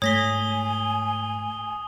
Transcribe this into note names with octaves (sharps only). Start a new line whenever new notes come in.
G#2 A3 C#5 G#5 D#6 A#6 B6 G7